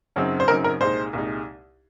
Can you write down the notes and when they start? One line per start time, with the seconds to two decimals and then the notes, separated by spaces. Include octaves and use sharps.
0.16 F#2 C#3 F#3 C4 D#4
0.40 C5
0.48 F#2 C#3 F#3 C4 D#4 A#4
0.64 A#4
0.80 C2 A#2 G#3 D#4 C5
1.13 C2 A#2 G#3 D#4